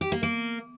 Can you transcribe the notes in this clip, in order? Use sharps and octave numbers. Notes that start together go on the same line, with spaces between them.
G4
A#3
A#3